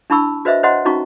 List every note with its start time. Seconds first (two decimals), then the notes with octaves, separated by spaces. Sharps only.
0.10 D4 E4 A5 B5 C#6 E6
0.45 F#4 B4 C5 D#5 E5
0.63 C5 C#5 D#5 F#5 A#5 C6
0.85 C#4 D#4 F#4 A#5 C#6